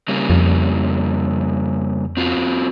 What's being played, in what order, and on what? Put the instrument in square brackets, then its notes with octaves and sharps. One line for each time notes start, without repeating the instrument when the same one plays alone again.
[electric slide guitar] C#3 G3 A#3
[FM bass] F2
[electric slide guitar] C4 F4 F#4